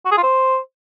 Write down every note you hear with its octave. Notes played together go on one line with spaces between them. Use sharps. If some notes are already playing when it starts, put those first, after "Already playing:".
F#4
G#4
F4
C5